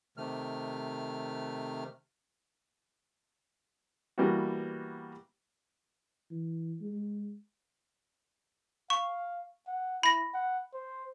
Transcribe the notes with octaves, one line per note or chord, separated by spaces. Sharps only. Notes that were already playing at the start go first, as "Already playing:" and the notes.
C3 D#3 A3 F6
E3 G3 A#3 B3 E4 F#4
E3
G#3
F5 C#6
F#5
E4 B5 A#6
F#5
C5